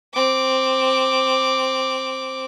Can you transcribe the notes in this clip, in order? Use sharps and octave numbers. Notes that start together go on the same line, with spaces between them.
C4 D6